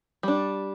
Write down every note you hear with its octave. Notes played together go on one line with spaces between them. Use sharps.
G3 D4